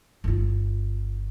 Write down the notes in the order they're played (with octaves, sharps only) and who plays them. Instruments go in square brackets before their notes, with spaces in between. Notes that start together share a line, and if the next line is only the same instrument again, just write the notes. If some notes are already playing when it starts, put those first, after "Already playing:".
[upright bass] G1 F4